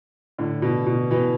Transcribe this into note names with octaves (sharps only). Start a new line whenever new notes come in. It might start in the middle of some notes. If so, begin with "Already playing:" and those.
A2 D3
B2
B2
B2 E3